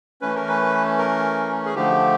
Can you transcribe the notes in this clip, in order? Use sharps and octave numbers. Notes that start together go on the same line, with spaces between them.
E3 A3 C#4 B4
A#4
B4
A#4
G#4
D3 F3 A3 G4